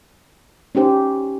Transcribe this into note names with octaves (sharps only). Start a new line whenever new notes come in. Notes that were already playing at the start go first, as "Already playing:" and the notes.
C#4 D#4 G4 C5